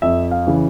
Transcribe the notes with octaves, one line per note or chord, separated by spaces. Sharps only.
F2 E5
F5
C#3 E3